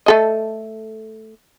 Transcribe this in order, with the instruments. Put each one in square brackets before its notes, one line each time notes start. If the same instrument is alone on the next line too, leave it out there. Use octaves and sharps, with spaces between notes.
[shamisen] A3 A4 D#5